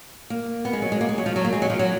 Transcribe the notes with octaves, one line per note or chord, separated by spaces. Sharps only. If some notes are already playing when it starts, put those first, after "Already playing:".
A#3
B3
G#3
F#3
G#3
A#3
G#3
F#3
F3
F#3
A#3
G#3
F#3
F3
F#3